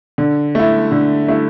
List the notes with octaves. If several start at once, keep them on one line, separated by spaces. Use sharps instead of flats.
D3
A3 E4
D3
A3 E4